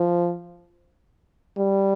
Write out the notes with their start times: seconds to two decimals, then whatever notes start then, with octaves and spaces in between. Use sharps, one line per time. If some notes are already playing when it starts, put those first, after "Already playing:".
Already playing: F3
1.57 G3